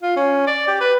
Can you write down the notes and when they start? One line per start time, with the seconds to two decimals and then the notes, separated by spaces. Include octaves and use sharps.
0.02 F4
0.16 C#4
0.47 D5
0.67 G4
0.81 B4